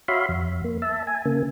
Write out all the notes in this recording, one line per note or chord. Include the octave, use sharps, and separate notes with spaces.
F#4 C#5 E5 F5 B5 C6
F2
A#3
E5 A5
G#5
C#3 A#3